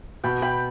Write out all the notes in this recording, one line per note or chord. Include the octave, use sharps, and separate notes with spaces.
B2 G5 B5
G5 B5